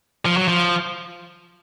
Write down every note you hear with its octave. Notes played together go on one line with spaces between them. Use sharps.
F3
F#3
F3